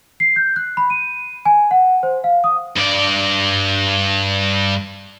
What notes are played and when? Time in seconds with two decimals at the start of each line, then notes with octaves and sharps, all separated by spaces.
0.20 C7
0.36 G6
0.56 F#6
0.77 B5
0.90 D#7
1.45 G#5
1.71 F#5
2.03 C5
2.24 F5
2.44 D#6
2.77 G2 D5